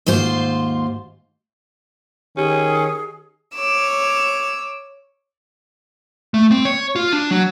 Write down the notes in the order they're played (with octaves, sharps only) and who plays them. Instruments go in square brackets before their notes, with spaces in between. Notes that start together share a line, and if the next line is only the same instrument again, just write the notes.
[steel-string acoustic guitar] D#2 G#2 F4 C5
[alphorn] D#3 [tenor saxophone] C#4 [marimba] G4 [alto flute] G#4
[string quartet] C#5 D6 E6
[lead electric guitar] A3
C4
C#5
F4
D4
F#3